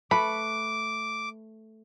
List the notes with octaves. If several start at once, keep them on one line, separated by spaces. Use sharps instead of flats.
A3 B4 B5 D6